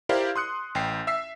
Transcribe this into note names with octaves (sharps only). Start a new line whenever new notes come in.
E4 G4 A#4 C5 D5 F5
C6 D#6 F#6 C#7
A1 G5 C7
E5 E6 B6 C7